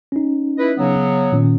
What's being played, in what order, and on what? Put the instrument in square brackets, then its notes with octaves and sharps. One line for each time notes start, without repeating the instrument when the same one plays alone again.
[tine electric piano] C#4 D#4
[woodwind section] E4 B4 D#5
C#3 F#3 B3
[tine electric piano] A#2 D#3 C#4